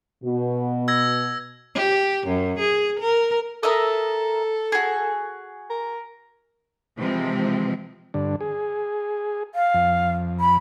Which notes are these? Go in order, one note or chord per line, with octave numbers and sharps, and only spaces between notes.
B2
E6 G#6 A#6
G4
F#2
G#4
A#4
A4 A#4 E5 D#6
F#4 G#4
A#4
C3 E3 F3 G#3 C4
G2 D3 D4
G#4
F5
F2
B5